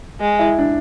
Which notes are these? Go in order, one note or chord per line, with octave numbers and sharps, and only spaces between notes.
G#3
E4
D4